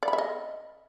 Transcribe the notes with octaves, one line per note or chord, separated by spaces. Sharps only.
D5
B5
E5
D#5